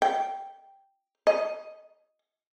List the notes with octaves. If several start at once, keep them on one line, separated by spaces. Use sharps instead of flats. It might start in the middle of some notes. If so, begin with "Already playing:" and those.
G5
D#5